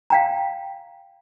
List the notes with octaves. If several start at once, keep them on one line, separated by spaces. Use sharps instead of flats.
F5 G5 A#5